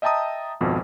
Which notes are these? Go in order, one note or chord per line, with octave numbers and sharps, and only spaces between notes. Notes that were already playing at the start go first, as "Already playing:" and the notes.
D#5 E5 G5 A5 A#5 D#6
G#1 F2 B2 F3